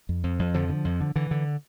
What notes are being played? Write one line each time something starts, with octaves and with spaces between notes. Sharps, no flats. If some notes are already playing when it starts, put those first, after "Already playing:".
F2
F2
F2
F2 D3 F3
D3
F2
D3
D3 E3
D3